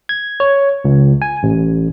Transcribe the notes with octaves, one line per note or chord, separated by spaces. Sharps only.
G#6
C#5
C#2
G#5
A1